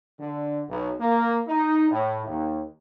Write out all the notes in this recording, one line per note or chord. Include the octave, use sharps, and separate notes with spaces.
D3
B1
A#3
D#4
A2
D#2